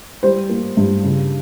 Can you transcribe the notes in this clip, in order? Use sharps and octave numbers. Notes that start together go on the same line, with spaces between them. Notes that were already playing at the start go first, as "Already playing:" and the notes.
G3 C5
A#3
G2
C#3